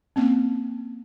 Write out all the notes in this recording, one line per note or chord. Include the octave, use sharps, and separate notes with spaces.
A#3 C4 C#4